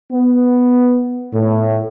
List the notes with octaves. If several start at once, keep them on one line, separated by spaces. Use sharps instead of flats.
B3
A2